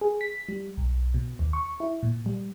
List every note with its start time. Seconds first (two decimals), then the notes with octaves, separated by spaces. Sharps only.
0.01 G#4
0.21 B6
0.48 G3
0.77 B1
1.14 B2
1.39 D#2
1.53 C#6
1.80 E4
2.03 A#2
2.26 G3